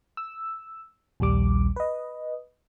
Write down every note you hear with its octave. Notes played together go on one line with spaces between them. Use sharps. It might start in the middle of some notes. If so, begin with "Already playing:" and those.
E6
A#1 D#2 G3 D6
B4 D#5